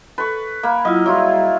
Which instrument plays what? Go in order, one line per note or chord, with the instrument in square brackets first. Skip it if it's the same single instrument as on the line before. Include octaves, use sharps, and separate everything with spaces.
[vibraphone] A4 [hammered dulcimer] B4 C#6
[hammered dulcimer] A#3 [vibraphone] B5
[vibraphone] F#3 E4 F4 [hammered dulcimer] D#5
[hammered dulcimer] F#3 E4 F4 [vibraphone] G3 G#4